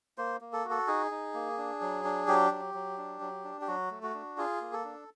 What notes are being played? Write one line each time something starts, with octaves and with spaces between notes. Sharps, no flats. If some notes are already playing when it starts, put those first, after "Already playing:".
A#3 C5
A#3
A4
F#4
A4
D#4 G#4
D#4
A#3
D4
F#3
D4
F#3 G4
F#3
F#3
D4
F#3
D4
G4
F#3 F#4
A3
F#4
D4
F4 G#4
A#3
A4
D4